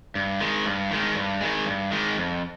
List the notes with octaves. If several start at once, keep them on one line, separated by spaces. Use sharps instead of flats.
G2
D#3 G#3
G2
D#3 G#3
G2
D#3 G#3
G2
D#3 G#3
F2